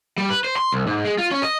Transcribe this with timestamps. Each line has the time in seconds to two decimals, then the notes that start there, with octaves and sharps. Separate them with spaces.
0.18 G3
0.30 B4
0.44 C5
0.56 C6
0.73 C2
0.87 G#2
1.05 G#3
1.18 F4
1.31 C#4
1.43 D#5